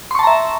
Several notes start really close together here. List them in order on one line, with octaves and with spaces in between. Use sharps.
C6 C#6 A5 A#5 E5